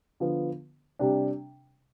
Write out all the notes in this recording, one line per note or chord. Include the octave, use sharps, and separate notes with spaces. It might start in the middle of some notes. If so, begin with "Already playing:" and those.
D3 F3 B3
C3 G3 D4